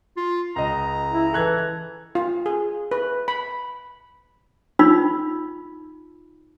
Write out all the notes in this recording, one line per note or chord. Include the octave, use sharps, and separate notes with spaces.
F4
C#2 D#5 A#5
E4
E3 A4 F#6 G#6
F4
G#4
B4
B5
D#4 F4 B5 E6